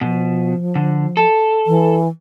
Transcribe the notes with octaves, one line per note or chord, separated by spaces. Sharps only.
B2 F3
D3
A4
E3